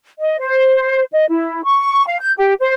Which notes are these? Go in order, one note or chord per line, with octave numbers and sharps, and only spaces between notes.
D#5
C5
D#5
E4
C#6
F5
G6
G4
C5